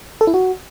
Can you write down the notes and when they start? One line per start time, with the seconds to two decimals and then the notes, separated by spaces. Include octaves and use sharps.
0.21 A4
0.27 E4
0.34 F#4